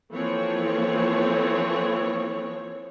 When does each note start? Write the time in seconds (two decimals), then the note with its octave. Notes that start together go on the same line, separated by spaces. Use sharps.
0.13 E3 F3 A#3 C4 A4 C#5